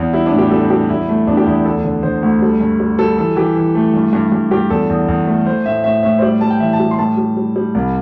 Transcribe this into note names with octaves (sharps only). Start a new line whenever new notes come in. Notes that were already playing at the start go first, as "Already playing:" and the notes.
Already playing: E2
G3 E4
D4
A2
G4
G3 A4
G3 G4
E2 E4
A3
E2 D4
G4
E2 E4
D2 A4
D3
D3 C5
D2
G3 A4
G2
G3
G3 A4
E3 A4
E3 G4
E3
A3
G2
G2
G2
G2 G4
E2 A4
E2
E2
A3
A3 C5
A2 E5
A2 E5
A2 E5
C5
G3 D5
G3 A5
G5
E3 E5
A5
G3
C6
A2 A5
G3
G3
G3
C2